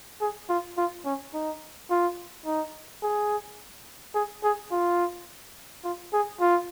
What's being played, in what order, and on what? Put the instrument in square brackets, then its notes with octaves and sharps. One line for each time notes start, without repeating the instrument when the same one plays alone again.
[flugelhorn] G#4
F4
F4
C#4
D#4
F4
D#4
G#4
G#4
G#4
F4
F4
G#4
F4